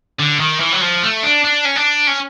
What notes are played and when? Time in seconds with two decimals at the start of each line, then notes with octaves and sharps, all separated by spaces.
0.19 D3
0.39 D#3
0.60 E3
0.72 F#3
0.81 F3
1.03 A3
1.23 D4
1.44 D4
1.65 C#4
1.76 D4
2.07 C#4